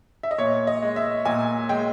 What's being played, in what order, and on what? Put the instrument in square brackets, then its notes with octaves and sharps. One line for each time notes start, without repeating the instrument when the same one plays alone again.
[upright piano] E5
D#5
A#2 C#5
D#5
G#3
E5
A#2 G#5
G#3 G5